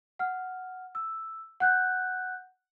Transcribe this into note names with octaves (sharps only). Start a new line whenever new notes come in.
F#5 F6
E6
F#5 F#6 G6